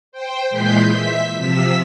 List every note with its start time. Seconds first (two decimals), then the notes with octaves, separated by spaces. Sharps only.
0.12 C5 G5
0.50 A#2 E3 G#3 C6 G6 B6
0.91 E5 B6
1.36 C3 F3 E6 B6